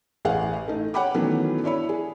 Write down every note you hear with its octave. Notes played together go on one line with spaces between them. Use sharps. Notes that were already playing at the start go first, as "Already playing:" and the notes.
A1 G#4 F5 F#5
A3 D#4
C#5 F#5 G5 B5 D6
D#3 E3 F#3 A3 B3 C#4
D4 E4 C#5 B5
G#4